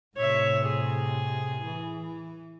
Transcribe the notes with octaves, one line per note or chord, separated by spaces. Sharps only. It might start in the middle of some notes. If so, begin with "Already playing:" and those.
A2 C3 C#5 E5
G#4
E3